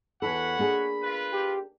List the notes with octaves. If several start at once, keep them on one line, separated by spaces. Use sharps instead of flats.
E2 E4 F#4 A4 C#5 F#5 B5
A#3 D4 G#4
F4 B4
G4